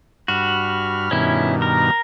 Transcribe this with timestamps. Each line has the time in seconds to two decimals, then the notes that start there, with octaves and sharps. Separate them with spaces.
0.28 G2 F#4 B5 F6
1.11 G2 B2 D#3 C#4 E4
1.62 A#4